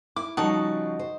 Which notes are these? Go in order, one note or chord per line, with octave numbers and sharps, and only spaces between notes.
E4 D6
C#3 F3 G3 D#4 F#4 A5 A#5 C#6
C5